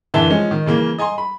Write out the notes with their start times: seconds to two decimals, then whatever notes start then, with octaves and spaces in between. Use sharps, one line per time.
0.14 F#1 D3 E3 E5 A5 E7
0.30 F3 G#3 C#4 D#4
0.51 D#3
0.66 C#3 E3 A#3
0.99 D#5 G#5 A#5 C6
1.18 B5